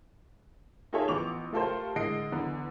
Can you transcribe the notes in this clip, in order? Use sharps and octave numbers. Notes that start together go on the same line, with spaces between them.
D#4 F4 G#4 A4 C#5 E5
A1 F3 B3 C#6 D6 F7
A3 F4 G4 A4 A#4 C5
A2 D3 G#3 D#5 C7 D7
E2 D3 B3